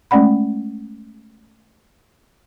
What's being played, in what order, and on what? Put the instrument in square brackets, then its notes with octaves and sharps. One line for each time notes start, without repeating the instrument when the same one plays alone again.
[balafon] G#3 A3 C#4 D5 F#5 B5